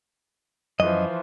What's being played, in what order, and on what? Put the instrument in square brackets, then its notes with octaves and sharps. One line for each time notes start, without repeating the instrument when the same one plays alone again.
[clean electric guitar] F#2 D#5 [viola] E3 F3